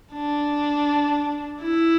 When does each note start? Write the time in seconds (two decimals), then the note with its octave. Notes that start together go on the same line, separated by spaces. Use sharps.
0.13 D4
1.61 E4